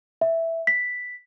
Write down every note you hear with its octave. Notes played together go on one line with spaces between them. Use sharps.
E5
B6